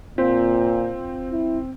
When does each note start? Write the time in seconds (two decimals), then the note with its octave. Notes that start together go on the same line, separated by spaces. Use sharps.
0.18 A#2 C4 F4 C5
1.31 E4